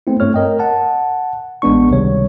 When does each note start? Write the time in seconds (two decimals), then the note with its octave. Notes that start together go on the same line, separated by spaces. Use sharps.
0.07 A3 B3 C4 E4
0.20 G2 A3 C#5 F6
0.34 A#4 D#5 G5
0.59 F#5 A5
1.62 A1 G#3 B3 D4 C#6
1.90 C#2 C3 D#3 G3 C#5